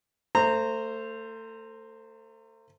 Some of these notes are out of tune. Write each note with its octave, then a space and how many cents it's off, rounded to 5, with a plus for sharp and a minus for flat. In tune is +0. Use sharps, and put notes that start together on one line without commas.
A3 +30 C5 +0 A#5 -20